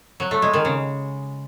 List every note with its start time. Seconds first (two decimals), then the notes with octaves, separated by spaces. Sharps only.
0.20 F#3
0.31 A3
0.42 G#3
0.53 D#3
0.65 C#3